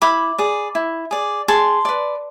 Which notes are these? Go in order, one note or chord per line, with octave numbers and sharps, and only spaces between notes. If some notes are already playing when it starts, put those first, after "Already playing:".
E4 B5 D6
G#4 D5
E4
G#4 D5
G#4 A5 C6
B4 D5